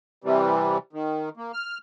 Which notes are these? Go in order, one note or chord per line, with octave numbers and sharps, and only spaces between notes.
C3 E3 G3
D#3
A#3
F6